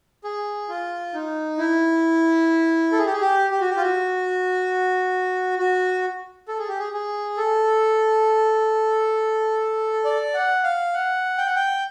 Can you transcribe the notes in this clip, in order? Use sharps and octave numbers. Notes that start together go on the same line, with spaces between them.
G#4
F4
D#4
E4
A4
G#4
G4
G#4
G4
G4
F#4
G4
F4
F#4
F#4
A4
G#4
G4
G#4
G#4
A4
D5
F#5
F5
F#5
G5
F#5
G5